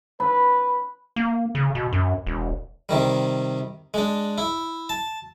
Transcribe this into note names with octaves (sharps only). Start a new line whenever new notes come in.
B4 B5
A#3
C#3
B2
F#2
E1
C3 D#3 G3
G#3 D4
E4
A5